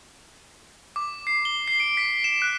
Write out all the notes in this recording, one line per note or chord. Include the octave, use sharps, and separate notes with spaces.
D6
C7
G7
C7
D7
B6
E7
F#6